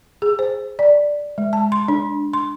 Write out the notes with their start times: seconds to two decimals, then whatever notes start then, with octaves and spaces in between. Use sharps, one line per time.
0.22 G#4
0.39 C5
0.79 D5
1.38 G#3
1.53 A5
1.72 C6
1.88 D4
2.33 C6